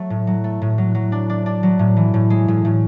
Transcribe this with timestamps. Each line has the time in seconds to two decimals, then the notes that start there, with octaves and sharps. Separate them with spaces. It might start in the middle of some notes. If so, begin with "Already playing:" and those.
Already playing: F#3 A3
0.10 A2
0.27 F#3
0.44 A3
0.62 A2
0.78 F#3
0.95 F#3
1.12 D4
1.30 D4
1.46 D4
1.63 F#3
1.79 A2
1.97 E3
2.14 A2
2.30 G#3
2.48 A2
2.65 A2